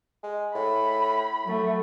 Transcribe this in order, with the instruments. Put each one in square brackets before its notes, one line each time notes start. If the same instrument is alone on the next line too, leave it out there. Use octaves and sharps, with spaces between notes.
[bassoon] G#3
[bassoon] A2 [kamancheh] B5
[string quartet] F#3 A3